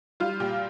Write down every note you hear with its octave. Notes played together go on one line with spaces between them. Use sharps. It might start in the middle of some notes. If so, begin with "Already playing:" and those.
G3 F4
A#2 G4